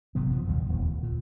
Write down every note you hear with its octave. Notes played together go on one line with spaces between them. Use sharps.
G#1 C3 F#3 B3
F#2 E3 F3
A#1 D#2 D#3 G3
D#1 E2
D2
A#2